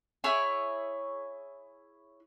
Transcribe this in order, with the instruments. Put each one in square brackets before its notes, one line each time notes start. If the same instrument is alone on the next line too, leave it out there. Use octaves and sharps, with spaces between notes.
[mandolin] E4 G#4 C#5 G#5